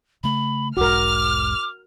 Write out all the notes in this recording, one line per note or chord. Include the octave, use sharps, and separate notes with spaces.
C#3 A3 B5
E1 B1 G#2 F#4 A#4 D6 F6